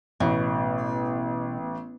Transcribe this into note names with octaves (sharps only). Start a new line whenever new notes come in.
A1 B2